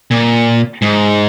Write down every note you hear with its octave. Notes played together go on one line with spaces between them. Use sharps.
A#2
G#2